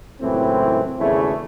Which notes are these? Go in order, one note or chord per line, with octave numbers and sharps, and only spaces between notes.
C#2 F#2 A2 E3 C4
G#1 E2 C#3 A3 C#4 E4